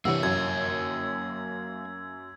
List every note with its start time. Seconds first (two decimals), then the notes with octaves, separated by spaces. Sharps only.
0.05 G2 C3 E3 A#3 C#5 F#5 E6
0.23 F#2 G#6